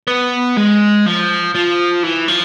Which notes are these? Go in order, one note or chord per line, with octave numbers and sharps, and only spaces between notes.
B3
G#3
F3
F3
E3
F3